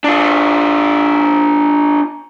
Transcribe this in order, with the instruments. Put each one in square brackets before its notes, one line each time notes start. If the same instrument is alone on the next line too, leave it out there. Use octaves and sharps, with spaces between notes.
[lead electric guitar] D4 F4